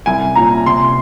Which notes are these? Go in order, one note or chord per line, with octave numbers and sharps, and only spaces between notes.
C2 G#5
A#2 A#5
C3 C6